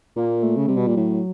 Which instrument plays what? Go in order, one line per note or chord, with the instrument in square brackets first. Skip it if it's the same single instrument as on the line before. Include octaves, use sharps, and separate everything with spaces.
[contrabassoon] A#2 [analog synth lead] A#3
[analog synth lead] A3
[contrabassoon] C#3
[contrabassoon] C3 [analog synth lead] G3
[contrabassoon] B2
A#2
[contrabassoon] A2 [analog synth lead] F#3